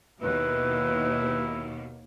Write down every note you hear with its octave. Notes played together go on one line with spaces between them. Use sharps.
D#2 B2 D#3 E4 B4